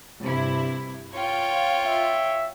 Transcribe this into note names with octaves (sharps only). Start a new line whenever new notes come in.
G2 C3 E4
F4 C#5 G5
E5